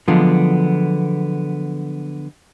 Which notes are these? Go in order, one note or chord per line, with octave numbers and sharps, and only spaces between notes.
D3 F3 F#3 G#3 B3 F4